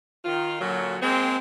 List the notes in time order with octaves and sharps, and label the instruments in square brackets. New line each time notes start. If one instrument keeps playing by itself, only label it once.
[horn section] D#3 F4
A#2 D3 F#3
G#3 A#3 C4